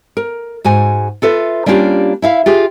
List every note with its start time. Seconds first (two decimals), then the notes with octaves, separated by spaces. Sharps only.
0.17 A#4
0.64 G#2 F#4 G#5
1.22 F4 A4 B4 E5
1.66 G3 A#3 C#4 D4 F4 G4
2.22 E4 E5 F5
2.46 F4 G4 G#4